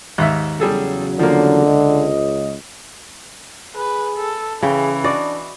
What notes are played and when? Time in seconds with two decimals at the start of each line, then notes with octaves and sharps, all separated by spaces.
0.18 D#2 G#2 E5
0.60 E2 C#3 F#3 G3 G#4 A4
1.19 D3 F3 A#3
1.66 C#2 D#5
3.76 G#4 B4
4.16 A4
4.63 C#3 E3 G#4 G5
5.04 D4 F#4 D5 D#5